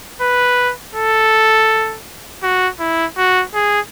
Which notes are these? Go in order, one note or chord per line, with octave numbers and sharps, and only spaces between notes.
B4
A4
F#4
E4
F#4
G#4